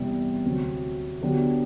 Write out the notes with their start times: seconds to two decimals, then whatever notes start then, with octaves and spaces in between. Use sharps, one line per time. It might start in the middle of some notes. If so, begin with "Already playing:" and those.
Already playing: E2 C3 G3
0.45 D2 C3 F#3 C4 F#4
1.21 D3 F#3 B3 D4 G4